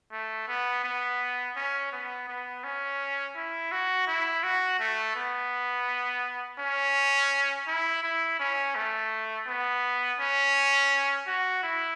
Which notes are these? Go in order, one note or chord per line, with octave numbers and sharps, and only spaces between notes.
A3
B3
B3
C#4
B3
B3
C#4
E4
F#4
E4
F#4
A3
B3
C#4
E4
E4
C#4
A3
B3
C#4
F#4
E4